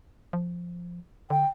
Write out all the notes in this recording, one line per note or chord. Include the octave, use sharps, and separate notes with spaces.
F3
D3 G5